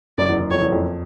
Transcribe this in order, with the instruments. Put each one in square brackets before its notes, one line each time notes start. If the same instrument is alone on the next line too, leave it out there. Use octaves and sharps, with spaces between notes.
[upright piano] F#1 F#2 [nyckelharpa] D5
[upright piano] E2
E2
[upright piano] F2 [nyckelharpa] C#5
[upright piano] E2
F2